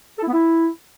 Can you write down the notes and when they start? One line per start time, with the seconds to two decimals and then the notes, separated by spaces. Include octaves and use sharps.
0.17 A4
0.22 E4
0.27 B3
0.32 E4